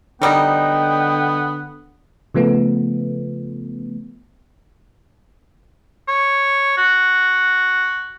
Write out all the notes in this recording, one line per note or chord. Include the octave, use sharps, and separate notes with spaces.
D3 F#3 G3 B3 D#4 G5
C#3 F3 A3 B3
C#5
F#4